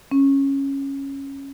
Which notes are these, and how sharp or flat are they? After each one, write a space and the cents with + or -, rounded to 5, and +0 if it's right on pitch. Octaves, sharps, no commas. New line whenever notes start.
C#4 -10